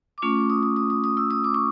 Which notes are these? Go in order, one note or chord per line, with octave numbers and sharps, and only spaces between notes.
D6
A3 C#4 F4 C#6
D6
D#6
D#6
D#6
D#6
D#6
E6
D#6
D6
C#6